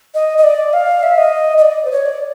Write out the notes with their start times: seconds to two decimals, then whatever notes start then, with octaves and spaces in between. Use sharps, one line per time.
0.14 D#5
0.38 D#5
0.44 D5
0.73 F5
1.03 E5
1.18 D#5
1.58 D#5
1.62 D5
1.85 C5
1.91 C#5
2.06 D5